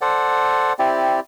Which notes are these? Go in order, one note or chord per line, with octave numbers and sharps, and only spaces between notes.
A4 C5 D5 F#5
C4 E4 G4 D5